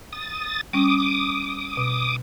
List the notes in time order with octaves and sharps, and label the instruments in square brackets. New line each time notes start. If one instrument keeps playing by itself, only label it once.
[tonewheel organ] D#6 A6
[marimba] G3 C#4 [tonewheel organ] D6 D#6
[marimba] B2